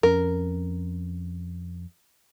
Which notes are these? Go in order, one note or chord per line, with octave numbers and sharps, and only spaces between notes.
F2 C#4 A#4